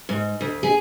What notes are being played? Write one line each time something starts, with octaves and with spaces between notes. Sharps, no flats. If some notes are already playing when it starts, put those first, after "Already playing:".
G#2
D2
G#4